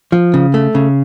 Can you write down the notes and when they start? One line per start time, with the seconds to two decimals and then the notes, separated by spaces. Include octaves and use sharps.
0.12 F3
0.34 C#3
0.54 A3
0.75 C#3